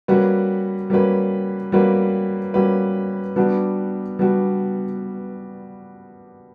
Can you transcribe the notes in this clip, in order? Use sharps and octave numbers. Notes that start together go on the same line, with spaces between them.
G3 A#3 C#4 F#4 B4
G3 A#3 C#4 F#4 B4
G3 A#3 C#4 F#4 B4
G3 A#3 C#4 F#4 B4
G3 B3 D4 F#4
G3 B3 D4 F#4